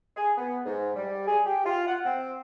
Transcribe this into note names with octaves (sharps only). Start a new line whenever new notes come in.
G#4
B3
G#2
G3
G#4
G4
F4
F#5
C4